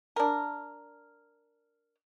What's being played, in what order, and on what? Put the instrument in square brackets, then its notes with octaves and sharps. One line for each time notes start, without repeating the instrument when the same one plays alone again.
[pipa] D4 A#4